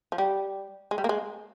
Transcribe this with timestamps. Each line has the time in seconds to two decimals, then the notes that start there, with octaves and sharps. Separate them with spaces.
0.12 F3
0.18 G3
0.91 G#3
0.98 G3
1.04 A#3
1.09 G#3